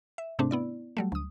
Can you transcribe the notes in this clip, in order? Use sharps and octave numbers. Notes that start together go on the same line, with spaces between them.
E5
G#2 C3 A3 C4 D4
B3 E4 D5
F#3 G3 A3
D2 D#6